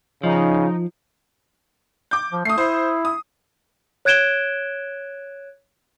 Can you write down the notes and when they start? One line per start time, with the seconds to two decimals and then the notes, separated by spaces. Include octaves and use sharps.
0.23 C#3 F3 D#4
2.11 D6 G6
2.32 F3
2.45 A3 D#6 C7
2.58 E4 C5
3.05 D#6
4.05 C#5 F#6 G#6 D7 E7 G7